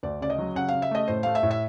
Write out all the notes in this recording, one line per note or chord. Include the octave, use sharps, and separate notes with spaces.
D2 D5
C#3 D5
D#5
F#3
C#3 F#5
C#3 F5
E5
A3 D#5
A2 C5
A3 F5
E5
A2
E5